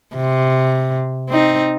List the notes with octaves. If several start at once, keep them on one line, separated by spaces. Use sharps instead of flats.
C3
C4 D#4